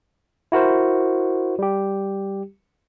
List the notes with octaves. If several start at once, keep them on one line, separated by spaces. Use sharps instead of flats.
E4 F#4 A#4 C5
G3 G4